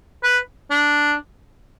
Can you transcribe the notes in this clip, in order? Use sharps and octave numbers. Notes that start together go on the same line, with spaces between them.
B4
D4